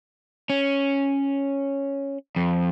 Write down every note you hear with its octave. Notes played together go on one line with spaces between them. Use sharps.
C#4
F2